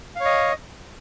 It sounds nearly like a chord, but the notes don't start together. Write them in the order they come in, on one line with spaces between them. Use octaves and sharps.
F5 C#5 D#5